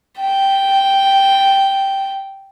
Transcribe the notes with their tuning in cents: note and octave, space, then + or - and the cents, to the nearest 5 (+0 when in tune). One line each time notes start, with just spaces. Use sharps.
G5 -5